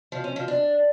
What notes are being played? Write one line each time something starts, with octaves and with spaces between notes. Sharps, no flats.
F3
C#4
F3
D4